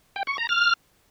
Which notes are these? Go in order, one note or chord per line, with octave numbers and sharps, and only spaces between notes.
G5
C#6
A#5
F6